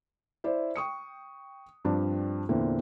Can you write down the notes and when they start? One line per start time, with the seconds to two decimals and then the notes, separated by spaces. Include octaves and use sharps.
0.44 E4 C5 D5 E5
0.76 G5 C#6 D#6 C#7
1.85 G2 F3 C4 D4
2.49 E2 A#2 D3 E3 C4